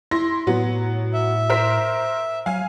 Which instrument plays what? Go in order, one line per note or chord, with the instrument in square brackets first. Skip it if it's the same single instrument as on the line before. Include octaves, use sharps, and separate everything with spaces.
[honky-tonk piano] E4 C6 A#6
[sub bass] A2 [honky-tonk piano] F#3 B3
[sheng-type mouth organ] E5
[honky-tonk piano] A#4 C5 B6
[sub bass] F#3 [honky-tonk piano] F5 G#5